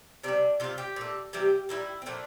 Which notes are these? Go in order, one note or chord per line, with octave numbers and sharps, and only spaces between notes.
C3 G3 D4
C3 G3 F4
G4
A#2 A3
C3 E3 G3 G4
A#2 G3 E4
C4
A#2 F3 A3 D4